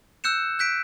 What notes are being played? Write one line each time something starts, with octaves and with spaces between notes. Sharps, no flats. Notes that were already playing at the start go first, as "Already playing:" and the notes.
E6 F#6 G6 C#7 E7
F#6 G6 B6 D7